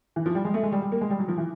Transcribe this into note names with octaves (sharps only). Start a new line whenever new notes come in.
E3
F3
G3
G#3
A3
G#3
G3
G3
A#3
G#3
G3
F#3
F3
E3